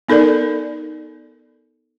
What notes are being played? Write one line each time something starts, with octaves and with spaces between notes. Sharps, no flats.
B3 D#4 A4 A#4 D5